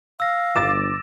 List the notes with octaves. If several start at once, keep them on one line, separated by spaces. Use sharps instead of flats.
F5 E6 A#6
G1 D6 A6 E7